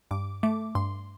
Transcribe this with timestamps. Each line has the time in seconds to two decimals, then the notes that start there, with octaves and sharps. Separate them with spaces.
0.11 G2 D6
0.43 A3 D6
0.75 G2 C6